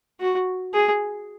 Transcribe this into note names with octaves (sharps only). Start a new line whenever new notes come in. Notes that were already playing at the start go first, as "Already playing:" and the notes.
F#4
G#4